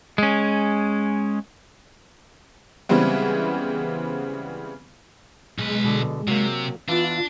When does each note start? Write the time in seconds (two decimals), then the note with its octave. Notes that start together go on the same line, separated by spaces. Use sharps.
0.18 G#3 C#4
2.89 C#3 E3 G3 G#3 B3 C4
5.58 B1 G#3 B4
5.84 B2 D3
6.28 C3 F#3 A#3
6.89 E3 B3 D4 F4